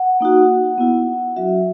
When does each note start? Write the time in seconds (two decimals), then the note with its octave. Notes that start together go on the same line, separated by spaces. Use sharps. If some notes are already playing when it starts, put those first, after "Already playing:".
Already playing: F#5
0.20 A#3 D#4 F#4
0.78 B3 E4
1.36 F#3 C#4 F#4 E5